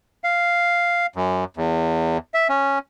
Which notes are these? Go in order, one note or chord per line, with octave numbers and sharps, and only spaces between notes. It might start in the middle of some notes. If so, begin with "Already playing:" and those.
F5
F#2
E2
E5
C#4